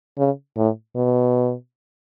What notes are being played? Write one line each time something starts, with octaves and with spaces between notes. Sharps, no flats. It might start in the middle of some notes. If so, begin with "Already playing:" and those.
C#3
A2
B2